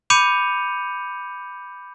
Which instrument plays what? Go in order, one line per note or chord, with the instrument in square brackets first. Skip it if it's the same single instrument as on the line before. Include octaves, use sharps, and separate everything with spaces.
[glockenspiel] B5 D6 G6 C#7 D#7 F7